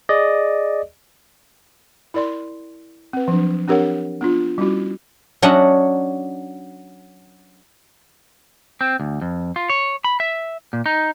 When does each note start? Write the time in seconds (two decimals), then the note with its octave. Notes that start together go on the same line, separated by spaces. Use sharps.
0.09 G#4 D5 D#5
2.14 E4 A#4 D5 C6
3.13 C4 B4
3.28 F3 F#3 D4
3.68 C4 D4 G4 A#4 C#5 F#5
4.21 B3 D4 F4
4.58 G3 C#4 E4 F#4
5.42 F#3 C#4 D4 D#5 E5 F#5
8.81 C4
9.00 D2
9.21 F2
9.56 F4
9.70 C#5
10.04 B5
10.20 E5
10.73 A#2
10.86 D#4